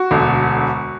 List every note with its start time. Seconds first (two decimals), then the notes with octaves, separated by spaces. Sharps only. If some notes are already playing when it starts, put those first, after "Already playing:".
Already playing: F#4
0.11 E1 D2 D3